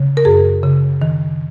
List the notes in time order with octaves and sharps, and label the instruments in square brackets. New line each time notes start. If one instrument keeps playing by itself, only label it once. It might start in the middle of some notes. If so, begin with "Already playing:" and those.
Already playing: [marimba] C#3
A#4
F#2 G#4
C#3
D#3